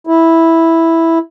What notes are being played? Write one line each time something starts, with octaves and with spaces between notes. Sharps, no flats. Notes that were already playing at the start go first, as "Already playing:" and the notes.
E4